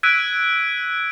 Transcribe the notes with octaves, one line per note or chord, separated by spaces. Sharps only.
E6 F#6 G#6 B6 D7 D#7